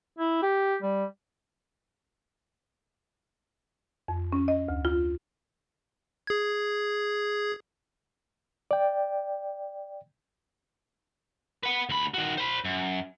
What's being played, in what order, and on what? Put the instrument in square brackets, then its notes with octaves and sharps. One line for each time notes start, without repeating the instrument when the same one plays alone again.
[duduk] E4
G4
G3
[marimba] F2
C#4
D#5
D2
F4
[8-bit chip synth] G#4 G#6
[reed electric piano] D5 G5
[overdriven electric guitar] B4 F#5
D2 B5
D#3 F#4
C5 B5
F#2